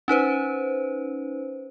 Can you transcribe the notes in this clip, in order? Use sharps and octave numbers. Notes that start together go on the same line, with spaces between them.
C#4 D#4 B4 C5